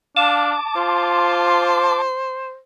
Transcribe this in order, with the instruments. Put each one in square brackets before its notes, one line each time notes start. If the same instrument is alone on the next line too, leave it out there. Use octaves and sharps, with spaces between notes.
[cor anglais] D4 [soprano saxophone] F5 [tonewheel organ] A5 D6
[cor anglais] F4 [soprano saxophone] C5